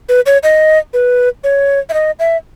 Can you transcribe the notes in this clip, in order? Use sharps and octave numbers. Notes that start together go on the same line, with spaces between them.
B4
C#5
D#5
B4
C#5
E5
D#5
E5